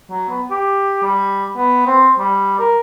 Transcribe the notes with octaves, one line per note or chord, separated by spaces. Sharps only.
F#3
B3
G4
G3
B3
C4
G3
A#4